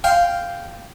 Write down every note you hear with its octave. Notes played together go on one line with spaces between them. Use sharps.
F5 G5 C6